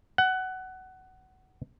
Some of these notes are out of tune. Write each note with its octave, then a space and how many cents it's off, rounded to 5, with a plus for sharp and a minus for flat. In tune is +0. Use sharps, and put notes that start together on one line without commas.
F#5 +15